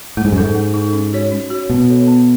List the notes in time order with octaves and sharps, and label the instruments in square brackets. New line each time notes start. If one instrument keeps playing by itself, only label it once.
[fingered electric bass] A2 [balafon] G#3
[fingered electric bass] G#2
F#2
[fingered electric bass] G#2 [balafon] D#4 A4
[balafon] G#3
D#4 A4
C#4
F#4 C#5
C#4
F#4 C#5
[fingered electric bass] B2 [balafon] B3
[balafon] F#4 A4 C#5
B3